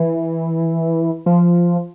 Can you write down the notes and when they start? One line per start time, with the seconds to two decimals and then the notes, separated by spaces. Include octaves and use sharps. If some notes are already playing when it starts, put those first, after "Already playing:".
Already playing: E3
1.26 F3